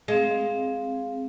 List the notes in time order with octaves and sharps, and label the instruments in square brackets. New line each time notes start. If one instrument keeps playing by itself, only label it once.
[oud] G#3 [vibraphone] C4 F5